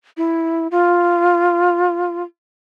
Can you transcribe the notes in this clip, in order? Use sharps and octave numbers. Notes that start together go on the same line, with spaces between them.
E4
F4